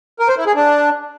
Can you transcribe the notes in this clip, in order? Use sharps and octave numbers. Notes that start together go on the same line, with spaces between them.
A#4
C5
E4
G#4
D4